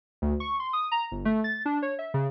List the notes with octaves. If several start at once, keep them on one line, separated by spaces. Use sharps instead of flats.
D2
C#6
C6
D#6
A#5
G1
A3
A6
D4
C#5
E5
C#3